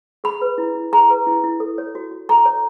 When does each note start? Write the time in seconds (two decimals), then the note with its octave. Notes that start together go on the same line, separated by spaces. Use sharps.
0.24 G#4 B5
0.41 B4
0.58 E4
0.75 E4
0.93 G#4 A#5
1.10 B4
1.27 E4
1.43 E4
1.60 A4
1.78 C#5
1.95 F#4
2.11 F#4
2.29 A4 A#5
2.45 C#5